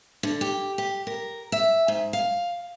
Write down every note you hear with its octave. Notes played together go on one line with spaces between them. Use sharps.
D3
G4
G4
A#4
E5
G#2
F5